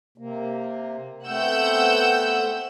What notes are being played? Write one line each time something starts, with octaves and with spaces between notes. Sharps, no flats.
C3 A#3
A3 B3 C4 F#5 E6 G6